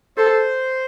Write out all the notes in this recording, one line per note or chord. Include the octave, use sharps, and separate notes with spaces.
A4 C5